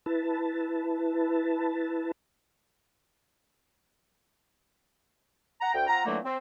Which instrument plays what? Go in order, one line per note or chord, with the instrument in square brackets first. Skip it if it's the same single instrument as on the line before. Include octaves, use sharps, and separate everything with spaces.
[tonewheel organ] E4 B4 A5
[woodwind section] F#5 A#5
D2 G5
C4 F4 F#5 A#5
A#2 D3 E3 F#3 A3 A#3
C4